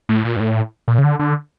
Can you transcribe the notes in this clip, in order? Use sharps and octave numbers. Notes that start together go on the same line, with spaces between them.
A2
A#2
G2
A2
A#2
C#3
D3
D3